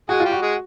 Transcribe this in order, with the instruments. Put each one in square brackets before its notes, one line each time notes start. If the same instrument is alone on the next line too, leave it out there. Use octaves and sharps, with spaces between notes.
[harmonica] G#3 G#4 [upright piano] F#4
[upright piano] F4
[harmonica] G3 G4
[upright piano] F#4
[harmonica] G#3 G#4